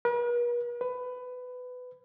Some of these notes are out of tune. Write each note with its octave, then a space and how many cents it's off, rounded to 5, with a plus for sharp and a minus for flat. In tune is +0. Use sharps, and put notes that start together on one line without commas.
B4 -45
B4 +20